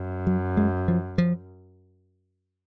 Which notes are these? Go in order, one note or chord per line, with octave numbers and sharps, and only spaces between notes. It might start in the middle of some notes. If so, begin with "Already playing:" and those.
Already playing: F#2
F#3
G#3
F3
F3